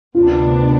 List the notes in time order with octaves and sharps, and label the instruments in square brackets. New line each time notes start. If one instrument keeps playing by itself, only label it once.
[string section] D2 C3 D#3 B3 D4 [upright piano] F4